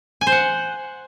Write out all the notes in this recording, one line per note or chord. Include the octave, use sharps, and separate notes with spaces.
G#5
C5
F#5